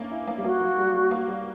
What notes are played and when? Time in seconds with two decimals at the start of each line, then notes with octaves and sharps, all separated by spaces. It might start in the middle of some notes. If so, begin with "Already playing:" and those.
Already playing: A#3 C#4 D4 E4
0.11 E4
0.27 A#3
0.38 G3
0.44 A#3 F#4
0.61 F#3
0.78 G3
0.94 G3
1.11 A#3
1.28 G3